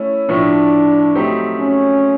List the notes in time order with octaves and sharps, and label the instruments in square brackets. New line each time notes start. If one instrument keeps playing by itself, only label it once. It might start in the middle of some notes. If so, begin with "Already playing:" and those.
Already playing: [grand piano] A3 C#4 E4
[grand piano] A2 F3 A3 [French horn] D4
[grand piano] F#3 A3 C4 D#4 G4
[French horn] C#4